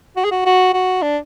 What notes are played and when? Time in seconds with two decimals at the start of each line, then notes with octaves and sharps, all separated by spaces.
0.17 F#4
0.25 G#4
0.31 F#4
0.46 F#4
0.74 F#4
1.03 D4